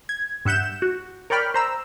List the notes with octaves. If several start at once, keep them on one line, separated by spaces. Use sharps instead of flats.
G#6
G2 E5 F#5 G6 E7
F#4
A#4 C#5 D5 G5 B5 F6
C5 A#5 E6